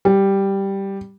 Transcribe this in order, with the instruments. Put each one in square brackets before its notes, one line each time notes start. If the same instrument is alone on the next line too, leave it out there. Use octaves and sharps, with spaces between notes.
[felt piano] G3